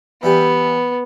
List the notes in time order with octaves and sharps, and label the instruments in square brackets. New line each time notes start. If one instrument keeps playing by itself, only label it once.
[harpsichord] E3 G3 G4 [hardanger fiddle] B3